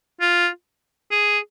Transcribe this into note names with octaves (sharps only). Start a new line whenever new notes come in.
F4
G#4